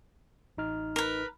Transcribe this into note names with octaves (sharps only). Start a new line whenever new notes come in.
A1 D#4 F6
A#4 B4